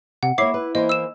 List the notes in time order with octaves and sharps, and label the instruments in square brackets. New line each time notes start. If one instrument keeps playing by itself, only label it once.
[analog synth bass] C3 [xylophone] F#5
[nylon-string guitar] A#3 C#5 [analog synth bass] E4 [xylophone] D6 C7
[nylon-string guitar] B4
[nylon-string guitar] E3 A#3 C5 [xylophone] D#5
[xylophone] E6 E7